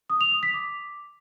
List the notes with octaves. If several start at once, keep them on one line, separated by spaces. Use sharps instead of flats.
D#6
F7
D#6
B6
D6